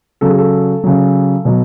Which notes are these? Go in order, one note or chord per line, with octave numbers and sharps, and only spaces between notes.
C#3 F#3 A4
G#4
A4
C#3 F#3
B2 F#3